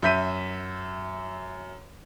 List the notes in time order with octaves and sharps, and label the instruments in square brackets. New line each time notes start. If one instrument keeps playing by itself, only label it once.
[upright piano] F#2 E5 G6 B6 D#7